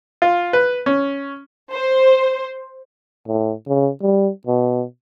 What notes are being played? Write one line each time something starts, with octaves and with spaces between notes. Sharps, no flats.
F4
B4
C#4
C5
A2
C#3
G3
B2